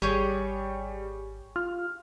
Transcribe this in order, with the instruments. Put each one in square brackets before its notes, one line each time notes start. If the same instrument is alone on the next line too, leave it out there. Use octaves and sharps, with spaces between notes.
[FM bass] G#1 [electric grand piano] G3 [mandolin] G4 G#4 C#5
[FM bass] F4 [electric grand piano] F6